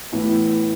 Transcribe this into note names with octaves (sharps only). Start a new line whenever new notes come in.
A2 E3 B3 E4